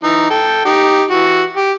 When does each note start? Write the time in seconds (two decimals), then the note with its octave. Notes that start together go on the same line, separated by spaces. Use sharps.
0.03 E3 D#4
0.30 A4 G5
0.65 D#4 G4
1.11 E3 F#4
1.56 G4